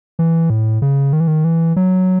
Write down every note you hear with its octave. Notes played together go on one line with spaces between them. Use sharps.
E3
A2
C#3
D#3
E3
D#3
E3
F#3